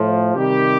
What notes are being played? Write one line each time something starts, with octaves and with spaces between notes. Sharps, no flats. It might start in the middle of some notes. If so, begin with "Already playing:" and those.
Already playing: A2 F3
C3 D#3 G3 G4